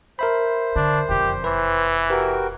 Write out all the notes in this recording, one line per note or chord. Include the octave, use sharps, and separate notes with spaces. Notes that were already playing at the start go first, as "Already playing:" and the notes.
A#4 C5 E5 B5
D3 D4
E1 F2 G4
E3 B4
F#4 G4 A#4 B4 G5